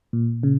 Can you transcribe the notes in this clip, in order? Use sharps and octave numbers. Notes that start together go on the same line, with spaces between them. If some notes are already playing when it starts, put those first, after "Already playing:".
A#2
C#3